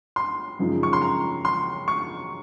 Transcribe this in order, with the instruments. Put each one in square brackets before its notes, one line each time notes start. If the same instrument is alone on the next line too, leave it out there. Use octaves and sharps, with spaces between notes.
[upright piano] C6
F#2 C#3 F3 G#3 D#4
C#6
C6
A#5
C6
C#6